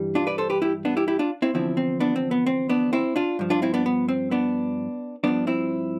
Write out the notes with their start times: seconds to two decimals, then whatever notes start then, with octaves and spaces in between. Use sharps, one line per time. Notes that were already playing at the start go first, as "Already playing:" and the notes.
Already playing: G2 E3 G3
0.15 D4 F4
0.27 B4 D5
0.38 A4 C5
0.50 G4 B4
0.62 E4 G4
0.85 B3 D4
0.97 E4 G4
1.08 E4 G4
1.19 D4 F4
1.42 C4 E4
1.54 E2 D3 F3 C4 E4
1.77 C4
2.00 B3 D4
2.16 C4
2.31 B3
2.47 C4
2.70 B3 D4
2.93 C4 E4
3.16 D4 F4
3.39 G2 F3
3.50 D4 F4
3.62 C4 E4
3.74 B3 D4
3.86 B3
4.09 C4
4.31 B3 D4
5.24 G2 F3 B3 D4
5.47 C4 E4